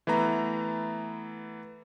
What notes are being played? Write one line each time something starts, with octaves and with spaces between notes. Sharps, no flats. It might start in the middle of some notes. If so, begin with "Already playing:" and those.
E3 A3 B3 A#5